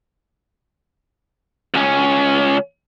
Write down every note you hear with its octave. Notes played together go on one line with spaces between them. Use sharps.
C#2 C#4